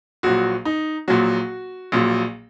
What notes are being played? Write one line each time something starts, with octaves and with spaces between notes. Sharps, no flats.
A#1 A#2 F#3 F#4
D#4
A#1 A#2 F#3 F#4
A#1 A#2 F#3